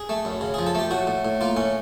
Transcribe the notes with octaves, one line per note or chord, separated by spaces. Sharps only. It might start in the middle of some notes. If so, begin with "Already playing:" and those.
Already playing: G#4
A3
F#2
C#3
F3 G#4
A4
A3 G4
A2 F#4
A2
A2
A#3 F4
A2 C#4